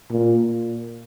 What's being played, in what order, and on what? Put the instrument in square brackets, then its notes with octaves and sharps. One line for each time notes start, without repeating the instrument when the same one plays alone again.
[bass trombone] A#2